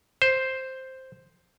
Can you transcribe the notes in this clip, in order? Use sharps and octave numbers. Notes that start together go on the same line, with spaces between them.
C5